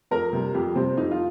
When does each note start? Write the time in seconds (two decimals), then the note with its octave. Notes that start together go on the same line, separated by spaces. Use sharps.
0.11 F2 A#4
0.33 C3 G3
0.54 F2 G4
0.75 C3 G3 C4
0.97 F2 D#4
1.11 F4